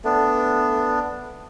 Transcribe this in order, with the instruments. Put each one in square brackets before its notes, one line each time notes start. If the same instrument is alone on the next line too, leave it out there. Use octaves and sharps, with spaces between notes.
[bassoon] A3 [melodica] B3 D4